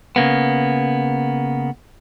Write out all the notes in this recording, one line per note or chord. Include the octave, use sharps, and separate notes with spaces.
C#3 A#3 B3